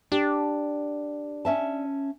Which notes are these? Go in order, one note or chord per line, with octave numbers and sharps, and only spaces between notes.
D4 G4
C#4 E5 A5